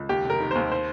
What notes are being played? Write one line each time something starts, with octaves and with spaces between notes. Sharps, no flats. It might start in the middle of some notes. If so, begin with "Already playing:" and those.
Already playing: C#2
D#2 G4
F1
A#4
D#3
D#2 C5
C5